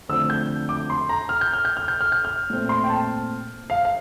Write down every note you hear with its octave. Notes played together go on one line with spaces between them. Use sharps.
D2 D3 F3 C4 E6
G6
D6
C6
A#5
F6
G6
F6
G6
F6
G6
F6
G6
F6
A#2 A3 C4
C6
G5
A5
F5
F5